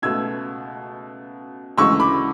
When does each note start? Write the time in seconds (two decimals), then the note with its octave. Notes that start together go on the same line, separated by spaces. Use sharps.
0.02 C#2 B2 A3 E6 G#6
1.78 D2 C#3 E3 G#3 C#6 E6
2.00 B5 D6